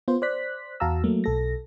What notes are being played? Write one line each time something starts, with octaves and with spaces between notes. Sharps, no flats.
B3 F4 C5
C5 D5 F#6 B6
E2 F#4 F5 A5 A#5 E6
F#3 A3 A#3
B1 A4 A#6